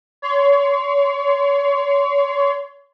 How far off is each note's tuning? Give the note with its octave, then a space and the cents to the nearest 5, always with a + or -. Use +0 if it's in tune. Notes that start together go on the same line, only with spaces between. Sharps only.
C#5 +30 C6 -10